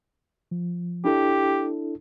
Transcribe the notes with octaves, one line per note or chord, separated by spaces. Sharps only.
F3
D4 E4 G4 A4